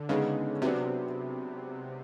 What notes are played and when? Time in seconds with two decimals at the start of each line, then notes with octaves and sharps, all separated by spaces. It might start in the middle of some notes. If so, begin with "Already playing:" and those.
Already playing: D3
0.09 C#3 G#3 B3 D#4
0.62 C3 F#3 B3 D4